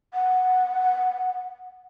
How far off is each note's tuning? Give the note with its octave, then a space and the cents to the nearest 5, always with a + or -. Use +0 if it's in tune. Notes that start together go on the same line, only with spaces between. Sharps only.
F#5 -5